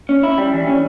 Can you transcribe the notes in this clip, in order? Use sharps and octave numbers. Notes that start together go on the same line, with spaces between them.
C#4
E4
G3
E3
C#4